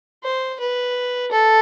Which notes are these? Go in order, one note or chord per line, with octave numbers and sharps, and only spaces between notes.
C5
B4
A4